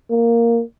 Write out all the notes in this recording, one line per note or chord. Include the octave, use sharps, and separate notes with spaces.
A#3